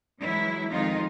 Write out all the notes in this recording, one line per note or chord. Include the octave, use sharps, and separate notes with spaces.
E3 F#3 G#3 E4
F2 D#3 F3 G#3 D#4 F4